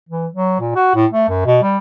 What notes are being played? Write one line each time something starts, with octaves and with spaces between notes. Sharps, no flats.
E3
F#3
A#2
F#4
A2
A3
F#2
B2
G3